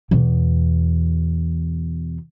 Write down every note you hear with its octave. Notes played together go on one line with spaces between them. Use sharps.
E2 B2